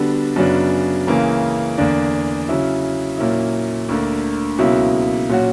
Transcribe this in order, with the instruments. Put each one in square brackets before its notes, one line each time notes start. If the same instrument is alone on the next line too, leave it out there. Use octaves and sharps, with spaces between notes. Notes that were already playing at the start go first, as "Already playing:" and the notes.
Already playing: [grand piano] D3 G3 B3 D4 F#4
F#2 C#3 F#3 B3 D4
C#2 C#3 E3 A#3
E2 D3 A#3 D4
C#3 F#3 C#4 E4
A#2 F#3 A#3 C#4 E4
D2 D3 A#3
C#2 B2 F#3 A#3 E4
A#2 F#3 C#4 F#4